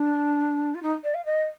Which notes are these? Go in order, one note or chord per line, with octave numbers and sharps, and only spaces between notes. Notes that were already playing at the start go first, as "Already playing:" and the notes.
Already playing: D4
F4
D#4
D5
F5
D#5